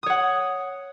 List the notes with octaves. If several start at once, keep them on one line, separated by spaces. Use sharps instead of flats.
C#5 F#5 D#6